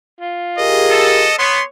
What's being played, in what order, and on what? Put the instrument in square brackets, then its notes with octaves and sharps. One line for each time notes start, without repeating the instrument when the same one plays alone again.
[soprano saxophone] F4
[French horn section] G4 G#4 A#4 [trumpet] D#5
[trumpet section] A4
[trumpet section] B3 [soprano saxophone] C#5 [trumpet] C6